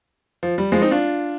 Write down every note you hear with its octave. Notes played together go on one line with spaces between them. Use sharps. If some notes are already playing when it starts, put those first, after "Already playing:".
F3
G3
F3 G#3
C4 D#4
D4 F4